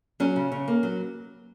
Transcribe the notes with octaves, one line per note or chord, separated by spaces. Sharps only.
F#3 C#4
C#3
C#3
A#3
F#3